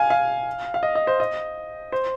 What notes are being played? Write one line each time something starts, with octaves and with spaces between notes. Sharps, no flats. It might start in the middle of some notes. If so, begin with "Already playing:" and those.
Already playing: F5 G#5
F5
F5
D#5
D#5
C5
D#5
C5